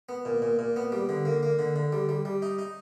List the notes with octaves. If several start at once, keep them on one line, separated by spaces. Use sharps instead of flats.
B3
A#2
A#2
A#2
B3
G3
D3
A#3
A#3
D3
D3
G3
G3
G3
D#4
D#4